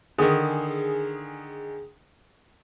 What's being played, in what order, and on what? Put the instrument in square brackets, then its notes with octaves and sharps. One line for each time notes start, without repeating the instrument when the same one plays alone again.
[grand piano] D3 D#3 [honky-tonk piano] G#4 D#6